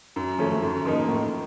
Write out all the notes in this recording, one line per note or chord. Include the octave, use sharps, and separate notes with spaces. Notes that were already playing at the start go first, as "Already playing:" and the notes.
F#2
F3 A3 C#4
F#2
F3 A#3 D#4
A2